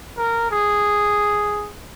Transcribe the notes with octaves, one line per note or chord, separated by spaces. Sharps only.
A#4
G#4